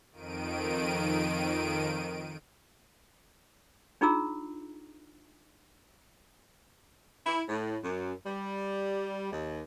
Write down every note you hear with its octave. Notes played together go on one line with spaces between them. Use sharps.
F2 D#3 D7 D#7
D4 D#4 F4 G#4 A#5 E6
E4
A2
F#2
G3
D#2